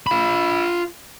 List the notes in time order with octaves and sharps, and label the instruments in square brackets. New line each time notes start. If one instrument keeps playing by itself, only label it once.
[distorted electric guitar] F4 B5